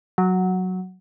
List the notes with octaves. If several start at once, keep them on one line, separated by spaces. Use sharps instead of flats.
F#3